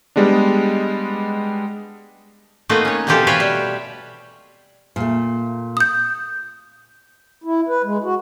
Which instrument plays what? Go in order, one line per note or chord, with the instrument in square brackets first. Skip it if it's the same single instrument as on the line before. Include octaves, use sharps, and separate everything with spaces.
[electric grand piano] G3 G#3 B3 D4
[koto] A3 A#3 C4 D#4 F#4 B4
C#4 C#5
B2 E3 C4 F4 G4 A4
B4 C#5 E5 F5 G5
G3
[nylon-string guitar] A#2 A3
[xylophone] D#6 G6
[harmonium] E4
B4
G#3
F#4